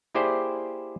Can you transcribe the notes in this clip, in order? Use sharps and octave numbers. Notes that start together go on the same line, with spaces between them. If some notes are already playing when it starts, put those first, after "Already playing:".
A#3 E4 G4 G#4 C5 D5